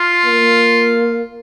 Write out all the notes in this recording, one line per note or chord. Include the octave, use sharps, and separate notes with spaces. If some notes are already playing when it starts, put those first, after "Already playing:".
Already playing: F4
A#3